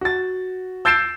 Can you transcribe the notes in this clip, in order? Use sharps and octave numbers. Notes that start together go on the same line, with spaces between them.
F#4 A6
E6 G6 A6 C7 D7 E7